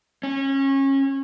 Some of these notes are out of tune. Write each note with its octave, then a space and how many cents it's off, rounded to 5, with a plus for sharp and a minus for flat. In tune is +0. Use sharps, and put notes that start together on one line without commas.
C#4 -25